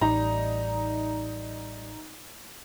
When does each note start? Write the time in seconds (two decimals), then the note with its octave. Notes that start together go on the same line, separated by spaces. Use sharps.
0.01 A1 G3 D#4 A#5